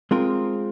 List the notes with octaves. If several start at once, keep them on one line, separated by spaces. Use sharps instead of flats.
G#3 C4 F4 A#4